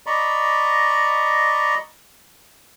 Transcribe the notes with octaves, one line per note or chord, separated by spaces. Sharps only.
D5 D#5 A#5 B5 C#6